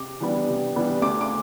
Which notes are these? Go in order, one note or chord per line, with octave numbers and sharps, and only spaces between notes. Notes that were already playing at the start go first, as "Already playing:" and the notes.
Already playing: C3 D6
E3 G3 B3 D4
C3
E3 G3 B3 D4
D2 D6
D6